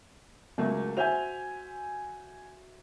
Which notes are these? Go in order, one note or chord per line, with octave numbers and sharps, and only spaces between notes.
C#2 F#3 A3 A#3
F#4 C5 E5 G#5 G6 F7